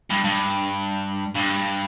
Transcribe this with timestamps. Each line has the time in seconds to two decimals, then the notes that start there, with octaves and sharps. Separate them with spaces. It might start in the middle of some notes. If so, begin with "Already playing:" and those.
0.10 G2
0.25 G2
1.35 G2